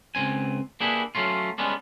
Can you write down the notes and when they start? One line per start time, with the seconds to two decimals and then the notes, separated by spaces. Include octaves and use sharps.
0.15 C#2 G2 C4 G#5
0.80 A#3 D4 E4 G4 G#4 B4
1.15 F#3 A3 C#4 F4
1.58 G3 G#3 B3 C#4 D4